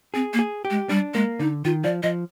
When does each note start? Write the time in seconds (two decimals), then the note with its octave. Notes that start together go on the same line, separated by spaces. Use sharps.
0.14 C4 G#4
0.33 A#3
0.39 G#4
0.65 G4
0.70 G#3
0.89 G3 D4
1.14 G#3 A#3
1.39 D3 D#4
1.65 D#3 F4
1.84 F3 D5
2.03 F3 D#5